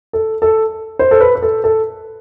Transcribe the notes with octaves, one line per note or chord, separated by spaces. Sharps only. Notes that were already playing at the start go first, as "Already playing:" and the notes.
A4
A4
C5
A4
B4
B4
A4
A4